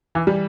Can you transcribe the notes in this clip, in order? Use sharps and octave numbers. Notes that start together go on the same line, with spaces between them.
E3
G3